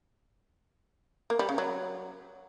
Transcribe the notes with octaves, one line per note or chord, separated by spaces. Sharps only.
A#3
G3
C#3
F#3